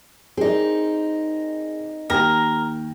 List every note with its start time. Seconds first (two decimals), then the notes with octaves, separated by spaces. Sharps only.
0.37 C4 D#4 G#4 A#4 D5
2.10 D#2 A#4 G5 A#6